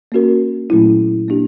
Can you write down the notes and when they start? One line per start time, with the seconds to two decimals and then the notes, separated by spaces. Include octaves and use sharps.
0.12 A#3 C#4 F#4 A#4
0.70 A#2 F#3 A3 C#4 E4
1.28 A#3 D4 G4